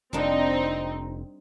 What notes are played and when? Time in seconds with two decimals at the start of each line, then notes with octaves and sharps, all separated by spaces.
0.13 F1 G3 A#3 C4 D4 D#4